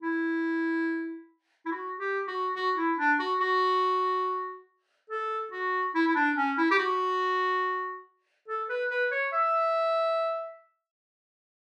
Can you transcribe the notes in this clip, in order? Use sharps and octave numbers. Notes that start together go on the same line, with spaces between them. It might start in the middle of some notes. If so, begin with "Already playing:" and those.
E4
E4
F#4
G4
F#4
F#4
E4
D4
F#4
F#4
A4
F#4
E4
E4
D4
C#4
E4
G4
F#4
A4
B4
B4
C#5
E5